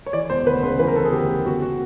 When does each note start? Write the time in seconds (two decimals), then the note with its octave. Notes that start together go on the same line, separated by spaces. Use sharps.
0.06 C#5
0.13 E3 D5
0.30 E1 C5
0.46 D2 B4
0.63 C#3 C5
0.79 E3 B4
0.87 A#4
0.96 E1 A4
1.05 G#4
1.12 D2 G4
1.29 C#3
1.46 G1 F#4
1.62 F#4